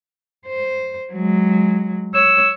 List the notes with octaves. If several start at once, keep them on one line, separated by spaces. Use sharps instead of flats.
C5
F#3 G#3
C#5 E6